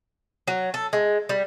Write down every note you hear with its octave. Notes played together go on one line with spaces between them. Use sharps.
F#3
A4
G#3
G3